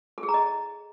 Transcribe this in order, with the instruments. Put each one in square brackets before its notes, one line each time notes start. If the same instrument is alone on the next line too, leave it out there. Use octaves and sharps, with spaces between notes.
[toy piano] A4
G#4
A#5
D#5